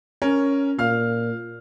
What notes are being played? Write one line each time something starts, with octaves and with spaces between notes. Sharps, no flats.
C#4 A#4
A#2 F5 F6